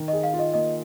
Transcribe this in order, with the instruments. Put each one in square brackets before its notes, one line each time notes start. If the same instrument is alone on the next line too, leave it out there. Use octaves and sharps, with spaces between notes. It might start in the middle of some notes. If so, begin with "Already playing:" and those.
Already playing: [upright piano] D#3
[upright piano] G#4 [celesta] D#5
[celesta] F5
[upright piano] F4
[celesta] D#5
[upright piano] A#3 [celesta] D#5